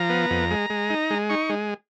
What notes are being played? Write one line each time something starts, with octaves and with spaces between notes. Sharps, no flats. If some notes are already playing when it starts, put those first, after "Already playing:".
Already playing: F3 A#5
B3
F2
G#3
G#3
D#4
G#3
D#4 C#6
G#3